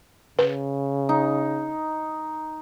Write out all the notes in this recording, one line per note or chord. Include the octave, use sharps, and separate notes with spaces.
C#3 B4
D#4